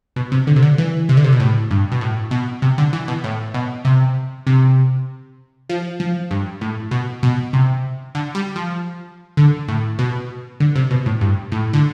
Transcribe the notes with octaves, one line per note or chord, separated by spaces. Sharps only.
B2
C3
D3
C3
D3
E3
C3
D3
C3
B2
A2
G2
B2
A2
B2
C3
D3
E3
B2
A2
B2
C3
C3
F3
F3
G2
A2
B2
B2
C3
D3
G3
F3
D3
A2
B2
D3
C3
B2
A2
G2
A2
D3